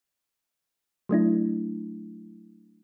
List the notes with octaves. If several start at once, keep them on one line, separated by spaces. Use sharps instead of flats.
F#3 A3 D4 E4